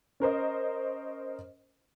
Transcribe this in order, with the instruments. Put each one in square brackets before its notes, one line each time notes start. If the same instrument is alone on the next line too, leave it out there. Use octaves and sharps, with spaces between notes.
[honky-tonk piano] C#4 A#4 C5 D#5